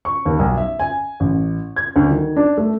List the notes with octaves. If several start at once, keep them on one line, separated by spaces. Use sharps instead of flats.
C#6
D#2
B1
E5
G#5
A1
G#6
D2
D#3
D4
A3